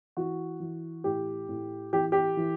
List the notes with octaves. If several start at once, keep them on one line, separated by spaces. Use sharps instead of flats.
E3 F#4
E3
A2 G4
A2
E3 G4
G4
E3